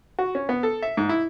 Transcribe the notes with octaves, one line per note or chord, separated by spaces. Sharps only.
F#4
C#4
B3
A4
E5
G#2
E4